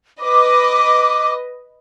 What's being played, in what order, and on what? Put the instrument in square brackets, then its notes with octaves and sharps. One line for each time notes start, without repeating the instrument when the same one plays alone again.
[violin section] B4 D#5 [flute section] D6